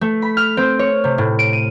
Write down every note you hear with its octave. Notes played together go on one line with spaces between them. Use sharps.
A3
B5
F6
C4
C#5
C3
A2
D7
D#7